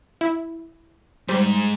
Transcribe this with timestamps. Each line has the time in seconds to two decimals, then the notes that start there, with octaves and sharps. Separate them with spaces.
0.21 E4
1.29 G#2 G3 C5